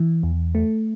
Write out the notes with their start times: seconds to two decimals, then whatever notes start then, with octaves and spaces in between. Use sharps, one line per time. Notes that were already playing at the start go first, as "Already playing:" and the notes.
Already playing: E3
0.23 E2
0.55 A3